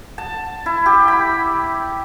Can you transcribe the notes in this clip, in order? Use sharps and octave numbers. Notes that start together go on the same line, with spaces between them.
A5
E4
G4
B5